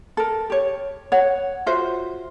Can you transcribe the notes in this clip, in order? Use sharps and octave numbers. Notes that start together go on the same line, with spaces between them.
A4 A#4
G4 C#5
C#5 F#5
F4 F#4 C5 E5